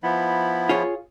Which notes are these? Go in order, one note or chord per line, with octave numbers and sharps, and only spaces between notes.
F3 B3 E4
F4 G#4 C#5